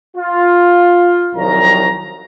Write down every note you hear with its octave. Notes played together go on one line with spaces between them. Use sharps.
F4
C2 D#3 F3 F#3 A#5